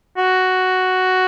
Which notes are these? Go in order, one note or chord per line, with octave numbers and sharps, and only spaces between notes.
F#4